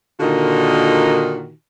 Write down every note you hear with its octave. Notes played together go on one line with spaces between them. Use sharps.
A#2 D3 D#3 D#4 F4 F#4